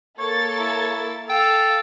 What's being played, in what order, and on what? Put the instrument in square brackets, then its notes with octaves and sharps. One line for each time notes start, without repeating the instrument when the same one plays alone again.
[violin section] A#3 A4 A6 [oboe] C#5
[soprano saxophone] E4
[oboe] A4 [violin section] F5 [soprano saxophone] G5